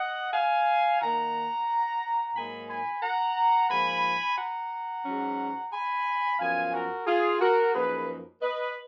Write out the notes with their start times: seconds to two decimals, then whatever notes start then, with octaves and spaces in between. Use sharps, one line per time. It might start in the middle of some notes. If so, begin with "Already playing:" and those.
Already playing: D#5 F#5
0.34 F5 G#5
1.01 D#3 A#3 D#4 F#5 A#5
2.36 G#2 F#3 A#3 D#4 G#5 B5
2.69 G#5 B5
3.03 F#5 A#5
3.70 G#2 F3 A#3 F4 G#5 B5
4.38 F#5 A#5
5.06 G#2 F#3 C#4
5.73 G#5 B5
6.40 F#2 F3 B3 F4 F5 G#5
6.73 F#4 A#4
7.07 F4 G#4
7.41 F#4 A#4
7.75 F#2 F3 A#3 D#4 G#4 B4
8.42 B4 D#5